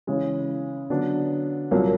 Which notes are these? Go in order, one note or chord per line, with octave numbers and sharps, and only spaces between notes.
C#3 E3 G#3 C#4
D3 F#3 B3 D4
C2 A#2 F#3 A#3